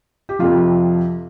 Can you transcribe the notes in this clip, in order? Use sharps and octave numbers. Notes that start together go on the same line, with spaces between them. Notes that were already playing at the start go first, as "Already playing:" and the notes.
G4
F2 C3 F3 F4